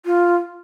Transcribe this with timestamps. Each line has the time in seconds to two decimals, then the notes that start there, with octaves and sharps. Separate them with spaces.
0.05 F4